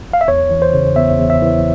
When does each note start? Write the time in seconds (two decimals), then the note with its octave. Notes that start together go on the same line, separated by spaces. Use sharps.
0.13 F5
0.21 E5
0.28 E2 C#5
0.51 E3
0.62 C5
0.74 C#3
0.96 E2 E5
1.19 E2
1.30 E5
1.42 E3